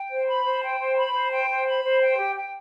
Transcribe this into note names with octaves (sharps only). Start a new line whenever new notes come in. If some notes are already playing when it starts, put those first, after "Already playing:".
Already playing: G5
C5
B5
C5
G5
C5
B5
C5
G5
C5
B5
C5
G5
G4
G5